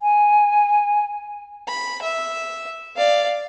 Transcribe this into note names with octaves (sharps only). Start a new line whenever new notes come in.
G#5
B5
E5
D5 F5